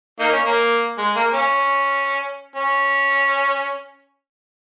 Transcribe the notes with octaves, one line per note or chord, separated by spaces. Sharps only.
A#3 D#4
C#4
A#3
G#3
A#3
C#4
C#4